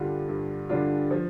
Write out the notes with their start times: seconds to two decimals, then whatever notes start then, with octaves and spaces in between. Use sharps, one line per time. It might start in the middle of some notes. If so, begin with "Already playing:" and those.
Already playing: G2 D3 G3 D4 F4
0.29 G2
0.69 D3 G3 D4 F4
1.11 F3